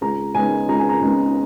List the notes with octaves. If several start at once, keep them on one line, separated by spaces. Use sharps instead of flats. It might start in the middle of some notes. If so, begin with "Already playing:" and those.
C#2 A#5
C#3 G#3 B3 D#4 G#5
C#2 A#5
G#5
A#5
C#3 G#3 B3 D#4